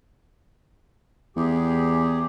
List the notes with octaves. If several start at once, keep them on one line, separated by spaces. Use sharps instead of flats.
E2 G4 G#4